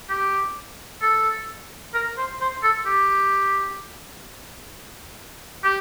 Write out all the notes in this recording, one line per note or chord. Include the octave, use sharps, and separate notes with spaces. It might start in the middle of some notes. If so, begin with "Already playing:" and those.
G4
A4
A#4
C5
C5
A4
G4
G4